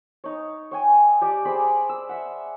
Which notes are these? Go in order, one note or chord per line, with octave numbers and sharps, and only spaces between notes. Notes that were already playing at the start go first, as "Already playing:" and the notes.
D#4 C#5
C#5 G5 G#5
G4 D5 A5 D6
G#4 C5 D5 B5
E6
E5 F#5